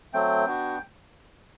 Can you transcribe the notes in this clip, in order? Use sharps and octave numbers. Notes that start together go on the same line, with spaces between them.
F#3 A3 C4 G5
B3 D4 F#4